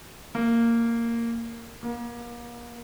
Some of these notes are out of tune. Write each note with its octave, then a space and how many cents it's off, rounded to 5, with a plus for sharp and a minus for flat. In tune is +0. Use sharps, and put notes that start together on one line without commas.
A#3 -10
A#3 +35